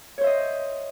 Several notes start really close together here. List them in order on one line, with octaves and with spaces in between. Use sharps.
C#5 C5 E5 D#5